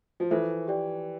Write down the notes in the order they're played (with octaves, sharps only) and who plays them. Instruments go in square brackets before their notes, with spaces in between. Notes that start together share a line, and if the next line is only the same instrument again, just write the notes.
[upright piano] F3
[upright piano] E3 [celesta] F4 A4 C5 E5
[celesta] G4 D5 G5